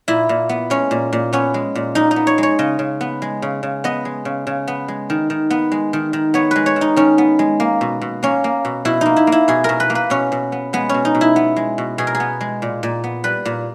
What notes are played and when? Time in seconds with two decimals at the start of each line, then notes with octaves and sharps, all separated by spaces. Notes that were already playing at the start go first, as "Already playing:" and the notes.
0.08 A#2 E4
0.29 A#2
0.49 B3
0.70 G#3 C#4
0.91 A#2
1.13 A#2
1.33 B3 C#4
1.54 G#3
1.75 A#2
1.95 A#2 D#4
2.11 D#4
2.16 B3
2.27 C#5
2.38 G#3 C#5
2.59 C#3 D#5
2.79 C#3
3.01 B3
3.22 G#3
3.42 C#3
3.63 C#3
3.84 B3 D#5
4.05 G#3
4.25 C#3
4.47 C#3
4.68 B3
4.88 G#3
5.10 D#3
5.30 D#3
5.50 B3
5.72 G#3
5.93 D#3
6.13 D#3
6.34 B3 C#5
6.51 G#3 B4
6.66 C#5
6.76 D#3
6.81 D#4
6.96 D#3 C#4
7.18 B3
7.39 G#3
7.60 A#3
7.81 B2
8.01 B2
8.23 A#3 C#4
8.44 A#3
8.65 B2
8.85 B2 E4
9.01 A#3 D#4
9.16 E4
9.27 A#3
9.32 E4
9.48 B2 G#4
9.64 B2 A#4
9.80 B4
9.90 A#3
9.95 B4
10.10 B2 C#4
10.32 B2
10.52 B3
10.73 G#3 B3
10.89 B2 C#4
11.05 D#4
11.15 B2
11.21 E4
11.36 B3
11.56 G#3
11.78 B2
11.98 B2 G#4
12.07 A#4
12.15 G#4
12.20 B3
12.41 G#3
12.62 A#2
12.83 A#2
13.04 B3
13.24 G3 B4
13.45 A#2